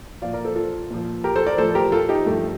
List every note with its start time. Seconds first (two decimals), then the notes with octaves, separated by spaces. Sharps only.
0.22 A#2 F3 D5 F5
0.33 A#4 D5
0.45 A4 C5
0.56 F4 A4
0.90 A#2 F3
1.24 G4 A#4
1.36 A4 C5
1.47 A#4 D5
1.58 A2 F3 A4 C5
1.75 G4 A#4
1.92 F4 A4
2.09 D#4 G4
2.26 G2 F3 A3